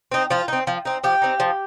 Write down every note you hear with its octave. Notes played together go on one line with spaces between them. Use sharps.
C4 D#4
F3 F4
C4 D#4
F3
C4 D#4
F3 G4
C4 D#4
F3